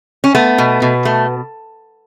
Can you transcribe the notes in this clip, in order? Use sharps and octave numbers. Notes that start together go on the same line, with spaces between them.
C#4
A3 B3
B2
B2
A3